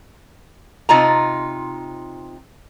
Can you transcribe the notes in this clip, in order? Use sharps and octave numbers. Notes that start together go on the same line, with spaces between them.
C3 D#4 F4 A5 A#5